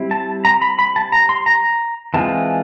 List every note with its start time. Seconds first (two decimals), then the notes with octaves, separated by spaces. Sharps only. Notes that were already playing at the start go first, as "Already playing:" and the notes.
Already playing: G3 C4 E4
0.11 A5
0.45 A#5
0.62 B5
0.79 B5
0.96 A5
1.12 A#5
1.29 C6
1.46 A#5
2.14 E3 G#3 C4 F4 A5